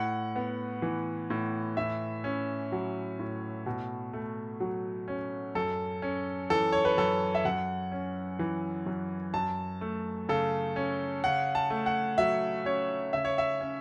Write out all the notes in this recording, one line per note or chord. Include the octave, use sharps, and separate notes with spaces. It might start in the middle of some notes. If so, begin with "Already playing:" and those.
Already playing: A2 F#5
B3
E3
A2
A2 E5
C#4
F#3
A2
B2
A3
F#3
C#4
F#2 A4
C#4
E3 A4
C#5
B4
F#2 A4
E5
F#2 F#5
C#4
E3
F#2
F#2 A5
A3
C#3 A4
C#4
C#3 F#5
A5
A3
F#5
F#3 E5
C#4 C#5
C#3 E5
C#5
E5
C#4